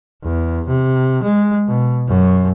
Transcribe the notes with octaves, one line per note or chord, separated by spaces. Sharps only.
E2
C3
G#3
B2
F#2